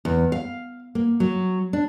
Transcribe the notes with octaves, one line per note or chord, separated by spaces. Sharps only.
E2
F5
A#3
F#3
D4